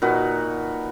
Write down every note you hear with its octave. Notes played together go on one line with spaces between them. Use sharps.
A#2 D#4 F#4 B4